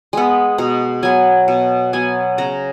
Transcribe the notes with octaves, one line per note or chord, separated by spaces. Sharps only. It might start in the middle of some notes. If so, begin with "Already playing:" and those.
G#3 B3
B2 A#5
F#3 B3 G#5
B2
F#3 B3 G#5
C#3 A#5